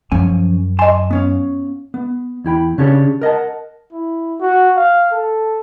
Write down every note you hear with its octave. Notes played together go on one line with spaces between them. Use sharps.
F#2 F3 C#4 G#5
D#5 G#5 A5 C6
B3 C#4 F5
B3
E2 E4 G5 B5
C#3 C#4 D4 G4 G#4 C#5
A#4 D#5 F#5 A5
E4
F#4
F5
A4